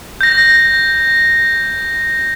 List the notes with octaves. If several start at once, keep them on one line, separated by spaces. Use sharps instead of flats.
G6 A#6